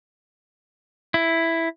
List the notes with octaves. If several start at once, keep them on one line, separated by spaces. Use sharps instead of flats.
E4